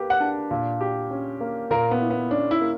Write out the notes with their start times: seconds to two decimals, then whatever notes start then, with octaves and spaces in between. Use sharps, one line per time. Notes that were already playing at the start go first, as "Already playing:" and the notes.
Already playing: A#3 G4 B4
0.10 F#5
0.20 D4
0.51 A#2
0.81 G4
1.11 C#4
1.41 A#3
1.70 A#2 A#4
1.91 B3
2.01 E4
2.10 B3
2.31 C#4 D4
2.51 E4
2.61 A#3